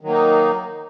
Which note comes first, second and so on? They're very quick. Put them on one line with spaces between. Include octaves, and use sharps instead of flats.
D#3 F#3 A#3 D#4